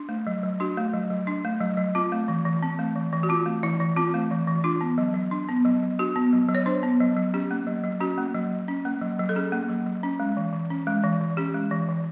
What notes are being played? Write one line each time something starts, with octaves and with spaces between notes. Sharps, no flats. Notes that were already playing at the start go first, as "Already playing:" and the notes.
Already playing: D4
A3
F#3
F#3
D4 F#4
A3
F#3
F#3
D4
A3
F#3
F#3
C4 F4
A3
E3
E3
C4
A3
E3
E3
F#4
C4 F4
A3
E3 E4
E3
C4 F4
A3
E3
E3
D4 F4
B3
F#3
F#3
D4
B3
F#3
F#3
D4 F#4
B3
F#3
F#3
C#5
D4 C5
B3
F#3
F#3
C#4 G4
A#3
F#3
F#3
C#4 F#4
A#3
F#3
F#3
C#4
A#3
F#3
F#3
A4
C#4 G#4
A#3
F#3
F#3
C#4
G#3
E3
E3
C#4
G#3
E3
E3
C#4 G4
G#3
E3
E3